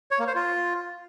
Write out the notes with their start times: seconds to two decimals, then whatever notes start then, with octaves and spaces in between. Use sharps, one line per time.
0.11 C#5
0.19 A#3
0.27 C5
0.35 F4